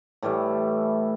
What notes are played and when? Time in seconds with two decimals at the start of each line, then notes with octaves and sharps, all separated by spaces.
0.23 A2 E3 G3 A3